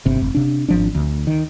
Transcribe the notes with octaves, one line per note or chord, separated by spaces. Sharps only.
G1 C3
F1
C3 D4
G#1 F3 D4
D2
D#3